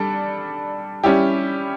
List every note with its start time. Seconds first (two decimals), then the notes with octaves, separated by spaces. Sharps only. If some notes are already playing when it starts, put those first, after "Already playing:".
Already playing: G3 D4 A4
1.04 G3 C#4 E4 G4